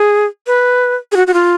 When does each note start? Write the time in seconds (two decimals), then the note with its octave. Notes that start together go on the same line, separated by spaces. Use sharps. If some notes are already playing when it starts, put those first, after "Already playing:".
Already playing: G#4
0.47 B4
1.12 G#4
1.16 F#4
1.27 F#4
1.34 F4